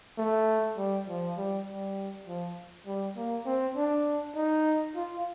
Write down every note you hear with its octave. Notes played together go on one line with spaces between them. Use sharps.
A3
G3
F3
G3
G3
F3
G3
A#3
C4
D4
D#4
F4